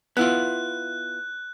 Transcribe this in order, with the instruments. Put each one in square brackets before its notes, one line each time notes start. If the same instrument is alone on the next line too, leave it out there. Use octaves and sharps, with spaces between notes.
[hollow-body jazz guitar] B3 E4 F4 [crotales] F#6